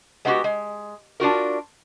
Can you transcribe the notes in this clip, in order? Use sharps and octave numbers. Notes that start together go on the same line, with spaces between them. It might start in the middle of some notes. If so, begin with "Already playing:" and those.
G#3 B3 C#4 E4 F#4 G4
G#3
D4 F4 F#4 A#4